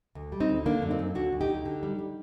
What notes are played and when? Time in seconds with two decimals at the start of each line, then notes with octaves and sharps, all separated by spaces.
0.15 D2
0.32 G3
0.40 C4 D#4
0.49 D2
0.66 D3 A#3 D4
0.82 F#2
0.91 C4 D#4
0.99 F#2
1.15 D2 D4 F#4
1.33 D2
1.41 D#4 G4
1.49 D2
1.65 D3
1.83 G3
1.99 G3